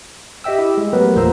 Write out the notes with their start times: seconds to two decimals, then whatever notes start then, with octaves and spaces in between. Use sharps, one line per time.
0.44 G4 D#5 E5 G5 E6
0.58 E4 G4
0.77 G#3
0.93 F#3 A3 B3 G4 A#4 B4
1.15 G1 E2 A#2 C5 A#5 E6